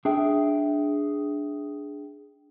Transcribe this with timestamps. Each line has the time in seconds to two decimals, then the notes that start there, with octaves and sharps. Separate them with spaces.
0.05 D4 G#4 E5 G5